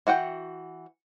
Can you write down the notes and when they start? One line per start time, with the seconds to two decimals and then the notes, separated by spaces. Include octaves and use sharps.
0.07 E3 F#4 F#5 G5